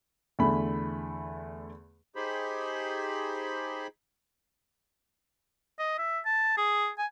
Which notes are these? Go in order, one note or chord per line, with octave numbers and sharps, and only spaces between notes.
E2 D3 A3 B5
D#4 G4 G#4 C5 B5
D#5
E5
A5
G#4
G#5